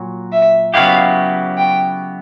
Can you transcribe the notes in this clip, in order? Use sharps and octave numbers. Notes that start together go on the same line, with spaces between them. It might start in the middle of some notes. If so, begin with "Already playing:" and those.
Already playing: A#2 F#3
E5
C#3 F#3 B3 E4 G4 F5
G5